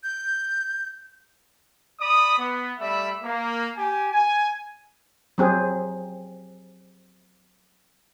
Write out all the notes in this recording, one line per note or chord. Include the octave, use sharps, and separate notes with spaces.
G6
D5 B5 D#6
B3
G3 A3 D5 E5 B5
A#3
G4 G#5
G#5
F#3 C4 G#4